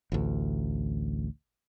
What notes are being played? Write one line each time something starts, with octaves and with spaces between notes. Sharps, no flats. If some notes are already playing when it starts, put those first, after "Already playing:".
A1 D2